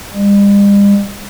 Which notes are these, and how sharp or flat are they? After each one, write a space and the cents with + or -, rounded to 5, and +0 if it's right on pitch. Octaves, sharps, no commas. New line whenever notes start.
G3 +45